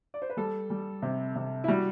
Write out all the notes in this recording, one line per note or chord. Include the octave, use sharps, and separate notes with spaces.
D5
C5
B4
G3 A4
G3
C3
C3
E4
G3 F#4